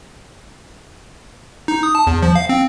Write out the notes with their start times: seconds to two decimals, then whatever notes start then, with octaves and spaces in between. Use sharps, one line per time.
1.68 D#4
1.83 D#6
1.95 A5
2.07 E2
2.23 F3
2.35 F5
2.49 C4